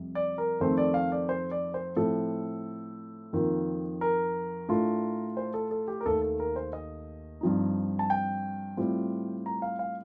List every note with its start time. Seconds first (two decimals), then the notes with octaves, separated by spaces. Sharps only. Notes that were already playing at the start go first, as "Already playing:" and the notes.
Already playing: F2 C3 G3
0.15 D5
0.38 A#4
0.60 F2 D#3 A3 C4 C5
0.78 D5
0.94 F5
1.12 D5
1.29 C5
1.51 D5
1.74 C5
1.96 A2 F3 C4 A4
3.33 F2 D#3 A#3 F4
4.01 A#4
4.69 A2 A3 D4 F4
5.37 C5
5.54 A4
5.71 A4
5.88 G4
6.01 A#4
6.06 D#2 D#3 A3 A4
6.22 A4
6.40 A#4
6.56 C5
6.73 D#5
7.41 G2 F3 C4 D#4
7.99 A5
8.10 G5
8.77 A2 G3 C4 F4
9.46 A#5
9.62 F5
9.79 F5